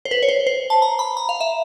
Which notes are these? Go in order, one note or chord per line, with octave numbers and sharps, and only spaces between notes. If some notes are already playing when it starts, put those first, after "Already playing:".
C5
B4
C#5
C5
C5
A5
A#5
B5
A#5
F5
E5